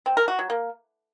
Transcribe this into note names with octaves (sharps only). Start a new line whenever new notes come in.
C4
A#4
F#4
F#3
A#3